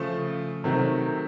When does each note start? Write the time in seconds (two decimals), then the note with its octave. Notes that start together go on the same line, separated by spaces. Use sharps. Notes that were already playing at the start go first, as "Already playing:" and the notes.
Already playing: C#3 F3 A3
0.64 C3 D#3 F#3 A3 C4